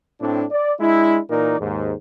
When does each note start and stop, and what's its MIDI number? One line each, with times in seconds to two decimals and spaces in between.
0.21 0.45 45
0.21 0.45 57
0.21 0.45 60
0.21 0.45 62
0.51 0.74 74
0.80 1.19 56
0.80 1.19 62
0.80 1.19 64
1.30 1.59 46
1.30 1.59 52
1.30 1.59 63
1.30 1.59 70
1.30 1.59 74
1.60 1.93 39
1.60 1.93 44